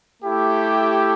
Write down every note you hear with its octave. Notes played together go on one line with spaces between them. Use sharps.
A3 E4 G4